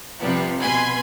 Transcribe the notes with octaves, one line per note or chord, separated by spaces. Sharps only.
C3 F3 G3 B3
B2 B4 G#5 B5 C6 G#6